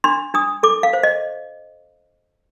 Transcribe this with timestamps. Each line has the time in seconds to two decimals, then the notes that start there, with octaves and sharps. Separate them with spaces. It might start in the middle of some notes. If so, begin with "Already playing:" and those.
0.04 D4 C6
0.34 D4 D#6
0.63 A4 D6
0.83 F5
0.93 C5
1.03 D#5